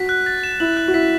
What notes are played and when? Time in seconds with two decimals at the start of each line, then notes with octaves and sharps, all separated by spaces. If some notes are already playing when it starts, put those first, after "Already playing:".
Already playing: F#4 B6
0.09 F#6
0.26 A6
0.43 E7
0.60 E4 F#7
0.77 F#6
0.88 F#4
0.94 E4 B6